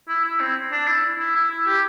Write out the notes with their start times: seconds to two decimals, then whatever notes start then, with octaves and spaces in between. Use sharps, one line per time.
0.09 E4
0.25 E4
0.40 C4
0.72 D4
0.87 E4
1.19 E4
1.35 E4
1.51 E4
1.66 G4